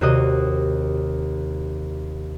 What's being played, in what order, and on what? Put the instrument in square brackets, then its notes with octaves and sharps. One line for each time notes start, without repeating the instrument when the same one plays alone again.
[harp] D#2 C3 D#3 F#4 D#5 D#6